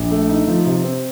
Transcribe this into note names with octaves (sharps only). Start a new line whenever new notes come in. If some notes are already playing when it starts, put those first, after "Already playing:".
Already playing: A#1
A3
D#4
F3
C3
C4